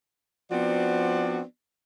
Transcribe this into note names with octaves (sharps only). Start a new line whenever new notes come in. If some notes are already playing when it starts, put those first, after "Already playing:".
F3 B3 C4 D4 F#4 D5